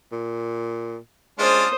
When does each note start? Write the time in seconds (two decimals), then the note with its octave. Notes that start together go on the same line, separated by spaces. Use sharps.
0.12 A#2
1.39 G#3 C#4 D4 F4 C5 D#6